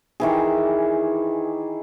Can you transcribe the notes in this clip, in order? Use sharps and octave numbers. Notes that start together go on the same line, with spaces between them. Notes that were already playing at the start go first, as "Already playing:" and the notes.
D#3 E3 G#4